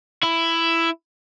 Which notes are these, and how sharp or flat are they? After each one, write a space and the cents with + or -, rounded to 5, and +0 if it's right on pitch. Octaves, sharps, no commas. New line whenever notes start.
E4 +10